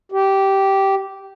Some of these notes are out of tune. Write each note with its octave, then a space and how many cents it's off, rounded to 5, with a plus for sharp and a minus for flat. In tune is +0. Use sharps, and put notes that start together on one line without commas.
G4 -10